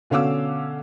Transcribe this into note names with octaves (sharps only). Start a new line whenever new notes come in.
B2 D3 C#4 F5 D6 E6